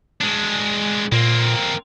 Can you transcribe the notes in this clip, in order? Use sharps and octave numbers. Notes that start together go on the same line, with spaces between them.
G#3 D4
A#2 A#3 C4